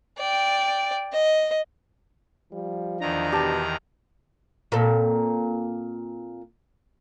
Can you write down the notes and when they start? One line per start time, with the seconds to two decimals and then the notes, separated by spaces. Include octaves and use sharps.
0.18 D5 G5
1.13 D#5
2.52 F3 G3
3.01 E2 D#3 D4 A#5
3.32 B2 G4 A5
4.72 A#2 C4 A4